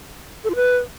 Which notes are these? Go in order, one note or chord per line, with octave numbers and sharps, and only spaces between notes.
A4
F4
B4